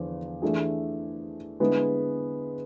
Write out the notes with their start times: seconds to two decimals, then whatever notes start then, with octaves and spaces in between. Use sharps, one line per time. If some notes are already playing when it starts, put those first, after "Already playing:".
Already playing: E2 D3 F3
0.42 E3 A3 D4 G#4
1.60 D3 G#3 B3 E4 G#4